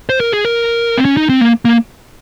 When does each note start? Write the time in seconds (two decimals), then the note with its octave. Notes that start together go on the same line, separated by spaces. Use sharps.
0.09 C5
0.20 A#4
0.32 G#4
0.45 A#4
0.98 C4
1.05 C#4
1.17 D#4
1.29 C4
1.40 A#3
1.65 A#3